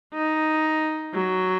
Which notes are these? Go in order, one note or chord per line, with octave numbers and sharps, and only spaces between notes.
D#4
F#3